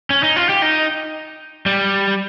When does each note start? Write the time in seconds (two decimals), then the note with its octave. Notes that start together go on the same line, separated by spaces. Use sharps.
0.10 C#4
0.23 D#4
0.36 F4
0.49 G4
0.62 D#4
1.66 G3